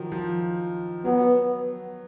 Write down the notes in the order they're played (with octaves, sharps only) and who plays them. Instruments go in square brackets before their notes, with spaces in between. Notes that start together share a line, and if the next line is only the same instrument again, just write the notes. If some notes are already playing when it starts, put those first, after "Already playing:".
Already playing: [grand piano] D#3 F3 F#3
F3
[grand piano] F#3 [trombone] B3